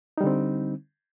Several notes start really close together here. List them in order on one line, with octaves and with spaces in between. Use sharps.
D#4 G3 D3 C4